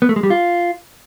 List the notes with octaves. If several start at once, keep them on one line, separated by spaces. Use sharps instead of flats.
B3
A3
G#3
G3
F4